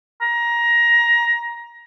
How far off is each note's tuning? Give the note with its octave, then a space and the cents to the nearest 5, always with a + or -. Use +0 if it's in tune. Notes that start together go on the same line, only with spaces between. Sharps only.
A#5 +20